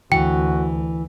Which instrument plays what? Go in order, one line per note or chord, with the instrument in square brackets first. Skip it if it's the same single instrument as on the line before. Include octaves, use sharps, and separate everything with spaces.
[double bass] D2 [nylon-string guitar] E3 [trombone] F#4 [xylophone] G5